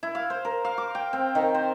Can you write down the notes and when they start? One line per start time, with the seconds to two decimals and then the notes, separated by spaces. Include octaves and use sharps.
0.03 E4
0.15 F5
0.30 C5
0.45 A#4
0.64 F5
0.78 D6
0.95 G5
1.13 C4
1.35 D#3
1.54 C5